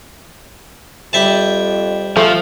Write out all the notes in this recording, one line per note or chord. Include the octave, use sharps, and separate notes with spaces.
F2 G3 E5 A5
F3 A3